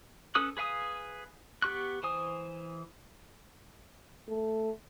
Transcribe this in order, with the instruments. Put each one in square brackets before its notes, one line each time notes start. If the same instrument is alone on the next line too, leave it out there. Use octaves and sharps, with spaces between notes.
[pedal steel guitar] C#4 A4 B4 D#6 F#6
G#4 B4 F5 G#5 D#6
B3 G4 C#6 F#6
E3 C5 G#5 D#6
[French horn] A3